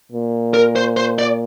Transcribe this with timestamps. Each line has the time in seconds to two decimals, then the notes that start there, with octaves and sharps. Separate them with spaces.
0.12 A#2
0.54 A#4
0.76 C5
0.97 C5
1.19 D5